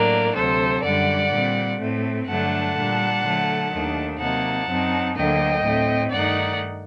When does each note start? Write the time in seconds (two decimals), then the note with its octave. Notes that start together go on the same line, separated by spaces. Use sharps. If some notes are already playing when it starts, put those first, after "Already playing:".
Already playing: A2 F#3 A#3 D4 A#4 D5
0.35 D2 C3 F#3 A4 C5
0.83 F#2 D3 G3 D5 F#5
1.32 A#2 G3 C4
1.80 A2 A3 C4
2.27 G2 D3 F#3 A3 D4 F#5 A5
2.76 A#2 G3 D4
3.24 D3 F#3 A3
3.72 D#2 D#3 A3 D4
4.20 C3 F#3 A#3 D#4 F#5 A5
4.68 F#2 F#3 C4 D#4
5.16 D2 D3 F#3 A#3 D4 D#5 G5
5.64 A2 A3 C4
6.12 G2 D#3 A3 D#4 D5 F#5